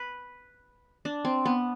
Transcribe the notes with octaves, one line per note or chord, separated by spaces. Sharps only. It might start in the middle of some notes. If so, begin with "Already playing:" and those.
Already playing: B4
D4
C4
B3